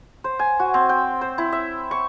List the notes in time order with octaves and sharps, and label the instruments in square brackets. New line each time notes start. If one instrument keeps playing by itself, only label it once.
[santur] C5
G#5
F#4
C4
G5
C5
E4
E5
C#6